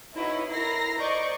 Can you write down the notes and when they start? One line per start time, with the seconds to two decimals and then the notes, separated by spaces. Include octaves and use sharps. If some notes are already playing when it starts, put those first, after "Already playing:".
0.15 D#4 E4 F#4 B4 C#5 D#5
0.51 E4 A#4 A#5 A#6 C7
0.98 C5 D5 D#5 C#6 D6 G6